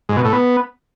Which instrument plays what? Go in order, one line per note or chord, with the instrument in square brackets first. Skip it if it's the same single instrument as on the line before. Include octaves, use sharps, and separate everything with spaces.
[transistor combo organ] G#2
B2
A2
B3